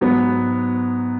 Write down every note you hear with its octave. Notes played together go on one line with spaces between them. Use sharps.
G#2 F#3 B3